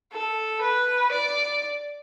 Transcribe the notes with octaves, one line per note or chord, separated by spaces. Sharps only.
A4
B4
D5